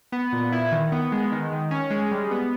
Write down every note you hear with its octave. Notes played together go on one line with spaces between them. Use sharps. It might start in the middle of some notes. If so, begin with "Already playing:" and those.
B3
A#2
E4
D#3
B3
G#3
D#3
D#3
C#4
G#3
G3
B3